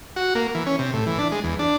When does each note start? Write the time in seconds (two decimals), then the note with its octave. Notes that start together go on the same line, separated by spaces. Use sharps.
0.16 F#4
0.35 A#3
0.55 E3
0.67 C#4
0.79 C3
0.94 A2
1.06 E3
1.18 D4
1.32 G#3
1.44 E2
1.59 D4